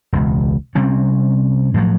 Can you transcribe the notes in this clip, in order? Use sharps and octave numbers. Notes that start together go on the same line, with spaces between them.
E1 C#2
C3 G3 C4 C#4
A2 F3 F#3